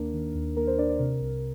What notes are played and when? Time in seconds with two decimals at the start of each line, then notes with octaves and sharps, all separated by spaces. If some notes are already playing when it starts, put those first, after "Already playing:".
Already playing: D#2 D#3 A#3 D4 A#4
0.14 D#3
0.35 D#2
0.57 A#3 A#4
0.67 C5
0.78 D4 D5
0.89 D5
0.99 C3 A#4
1.21 C2